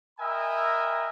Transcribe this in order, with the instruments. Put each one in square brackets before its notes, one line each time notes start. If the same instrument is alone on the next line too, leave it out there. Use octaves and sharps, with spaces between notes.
[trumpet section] A#4 D#5 E5 G5 G#5 B5